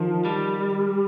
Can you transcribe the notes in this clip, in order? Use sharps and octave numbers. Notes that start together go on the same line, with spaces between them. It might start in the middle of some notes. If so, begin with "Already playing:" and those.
Already playing: D#3 F3
G3